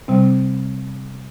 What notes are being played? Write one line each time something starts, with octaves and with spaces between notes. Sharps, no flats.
C3 G3 C4